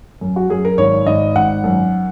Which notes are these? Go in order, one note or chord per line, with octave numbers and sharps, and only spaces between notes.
F#2
F#4
F#2 G#4
A#4
G#1 C#5
G#1 D#5
G#1 F#5
F#2